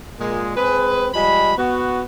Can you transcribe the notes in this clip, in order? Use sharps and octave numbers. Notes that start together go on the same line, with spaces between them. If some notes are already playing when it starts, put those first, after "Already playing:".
A#2 G#3
G#3 C4 G#4 B4
F3 G3 G#3 B5
B3 F#4